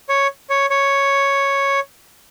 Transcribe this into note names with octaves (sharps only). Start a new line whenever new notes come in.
C#5
C#5
C#5